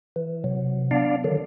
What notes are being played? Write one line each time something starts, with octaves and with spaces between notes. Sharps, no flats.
E3
C3 F#3
B3 D4 D5 F5
D3 D#3 F#3